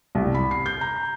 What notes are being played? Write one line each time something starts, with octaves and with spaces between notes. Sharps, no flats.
C2
B5
C7
G6
A#5